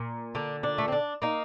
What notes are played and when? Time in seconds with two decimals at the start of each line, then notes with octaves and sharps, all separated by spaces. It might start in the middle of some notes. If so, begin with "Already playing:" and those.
Already playing: A#2
0.35 D3 D4
0.63 D4
0.78 A3
0.88 C4
0.92 D4
1.22 A#3 D#4